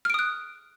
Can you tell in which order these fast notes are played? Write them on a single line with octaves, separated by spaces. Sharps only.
F6 D7 D#6 F#6